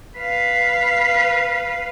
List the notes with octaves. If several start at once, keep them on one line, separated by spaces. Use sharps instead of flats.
B4 F5